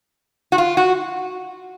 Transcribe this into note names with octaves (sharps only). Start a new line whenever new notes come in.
F#4
F4
F#4